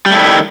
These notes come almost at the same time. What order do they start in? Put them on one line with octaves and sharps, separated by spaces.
G3 A3 E4 D#3